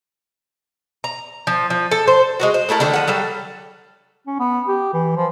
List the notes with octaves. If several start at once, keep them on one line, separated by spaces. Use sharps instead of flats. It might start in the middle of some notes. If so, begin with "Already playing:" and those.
A#5
F3
F3
A4
C5
G#3 B3 F#4
C5
A3 E4 A4 A#4
D3 D#3 A3 A4
F3 F#5
F#3 G3 A4
C#4
B3
G4
E3
F3